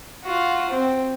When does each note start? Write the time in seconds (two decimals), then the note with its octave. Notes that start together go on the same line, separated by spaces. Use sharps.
0.24 F4 F#4
0.70 C4